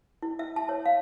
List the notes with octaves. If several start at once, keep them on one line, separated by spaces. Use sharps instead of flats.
E4
E5
A5
C#5
F5